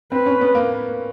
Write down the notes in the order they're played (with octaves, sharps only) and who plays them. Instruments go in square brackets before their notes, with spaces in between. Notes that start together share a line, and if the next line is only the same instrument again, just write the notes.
[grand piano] C4 [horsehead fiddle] B4
[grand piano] C#4
B3
A#3